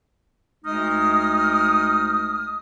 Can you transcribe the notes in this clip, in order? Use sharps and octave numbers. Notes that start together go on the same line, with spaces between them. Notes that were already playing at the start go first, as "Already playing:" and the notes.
D2 G#3 D#4 D#5 D#6 F6